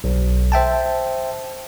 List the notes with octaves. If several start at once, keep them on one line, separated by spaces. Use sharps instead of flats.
B1
C5 E5 G5 A5